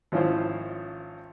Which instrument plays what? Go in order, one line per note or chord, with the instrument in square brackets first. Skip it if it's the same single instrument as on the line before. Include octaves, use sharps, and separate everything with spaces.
[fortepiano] G#1 F3 C#4 E4 F4 C5